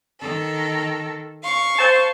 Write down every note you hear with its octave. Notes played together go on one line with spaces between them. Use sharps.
D#3 A4
F5 C#6
C5 A5